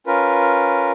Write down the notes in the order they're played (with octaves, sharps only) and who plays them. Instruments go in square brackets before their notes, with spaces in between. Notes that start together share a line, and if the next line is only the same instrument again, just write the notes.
[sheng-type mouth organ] C#4 F4 A#4 B4